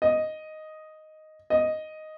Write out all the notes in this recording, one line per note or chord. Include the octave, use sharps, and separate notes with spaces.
D#5
D#5